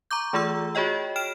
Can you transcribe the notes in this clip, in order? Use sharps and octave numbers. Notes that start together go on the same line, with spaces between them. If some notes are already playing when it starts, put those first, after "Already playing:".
A#5 C#6 D6 G6
E3 A3 F4 G#4 A#5 E6
F#4 G#4 C#5 D#5 G5
G5 F6 D7 E7